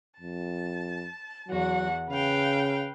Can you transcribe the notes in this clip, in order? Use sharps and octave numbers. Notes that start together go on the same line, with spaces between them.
F2 A5
E2 F#3 F#4 F#5
C#3 B4 F5 G5